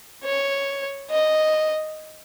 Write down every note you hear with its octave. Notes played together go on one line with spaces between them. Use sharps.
C#5
D#5